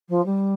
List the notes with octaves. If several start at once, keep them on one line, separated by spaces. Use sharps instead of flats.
F3
G3